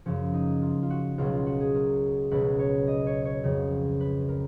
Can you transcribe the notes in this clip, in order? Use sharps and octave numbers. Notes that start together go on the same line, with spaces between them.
F#2 C#3 F3 C#4
D#4
F4
F4
F#4
C#2 B2 F#3 F4
F4
F#4
G#4
A#4
C#2 B2 F#3 B4
C#5
D#5
C#5
C#5
F2 C#3 F#3
B4
A#4